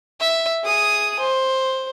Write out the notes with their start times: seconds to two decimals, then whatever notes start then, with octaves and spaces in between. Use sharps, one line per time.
0.20 E5
0.64 G#4 D#6
1.19 C5